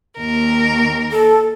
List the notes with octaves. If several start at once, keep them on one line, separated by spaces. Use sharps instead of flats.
D#2 A#4
A4